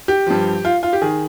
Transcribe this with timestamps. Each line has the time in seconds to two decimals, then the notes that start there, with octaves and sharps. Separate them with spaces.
0.08 G4
0.27 G2 F3
0.65 F4
0.83 F4
0.93 G4
1.02 D#3 G#4